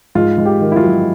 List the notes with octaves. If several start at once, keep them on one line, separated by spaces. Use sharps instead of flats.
G#2 F4
G#2
G4
D#3
E4
F4
F#3